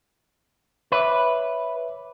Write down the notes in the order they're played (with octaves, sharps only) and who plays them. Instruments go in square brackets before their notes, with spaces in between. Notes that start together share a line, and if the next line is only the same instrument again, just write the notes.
[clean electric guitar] B4 [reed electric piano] C#5 E5 D6